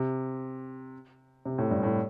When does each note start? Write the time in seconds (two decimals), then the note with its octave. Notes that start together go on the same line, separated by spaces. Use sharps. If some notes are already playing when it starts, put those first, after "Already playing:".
Already playing: C3
1.45 C3
1.58 A2
1.71 G2
1.83 A2